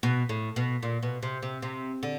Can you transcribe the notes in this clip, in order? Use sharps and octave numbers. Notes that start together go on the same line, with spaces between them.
B2
A2
B2
A#2
B2
C3
C3
C3
D3